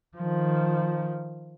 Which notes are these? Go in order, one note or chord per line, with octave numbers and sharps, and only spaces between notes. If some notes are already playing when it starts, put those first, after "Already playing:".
D#3 F3